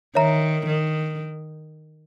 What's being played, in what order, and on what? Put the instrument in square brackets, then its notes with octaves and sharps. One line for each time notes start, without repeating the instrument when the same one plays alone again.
[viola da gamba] D#3 [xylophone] A#4 C#5 E5 A#5
[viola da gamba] D#3